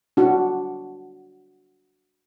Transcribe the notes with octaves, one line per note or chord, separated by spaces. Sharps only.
D4 F#4